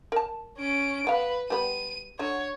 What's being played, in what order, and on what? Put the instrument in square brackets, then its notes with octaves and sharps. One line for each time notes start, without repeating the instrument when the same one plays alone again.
[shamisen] A#4 A5
[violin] C#4 D7
[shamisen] B3 F5 [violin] B4
[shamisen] G3 B3 B4 [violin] D#7
[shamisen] D3 F#4 [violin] C#5